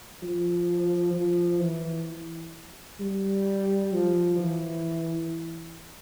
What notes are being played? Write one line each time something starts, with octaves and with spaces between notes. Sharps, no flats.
F3
F3
E3
G3
F3
E3